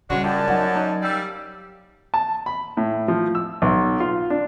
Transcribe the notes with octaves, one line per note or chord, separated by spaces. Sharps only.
C#3 G3 G#3 D4 F#4 B4 C#5
F#2 F4 G4 D5 A5
F#3 D#4 F#5 G5
C#4 D#4 A#4
G3 F5 E6
A5
B5
A2
F3
E6
B1
F4
D4